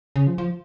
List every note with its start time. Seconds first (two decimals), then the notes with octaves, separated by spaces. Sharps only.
0.16 C#3
0.27 F3
0.38 F3